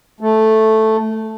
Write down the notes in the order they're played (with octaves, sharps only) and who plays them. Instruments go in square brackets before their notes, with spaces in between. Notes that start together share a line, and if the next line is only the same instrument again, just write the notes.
[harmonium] A3